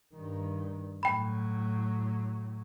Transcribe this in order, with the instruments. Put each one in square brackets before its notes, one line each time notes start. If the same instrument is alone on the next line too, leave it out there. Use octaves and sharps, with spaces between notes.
[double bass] G2 D#3
[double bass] A2 F#3 [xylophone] G5 B5